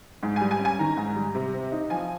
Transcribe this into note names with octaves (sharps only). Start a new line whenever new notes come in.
G#2
G3 G#5
G#5
C#4
G#5
D#3 A#5
G#2
G3
C3
C4
D#4
F3 G#5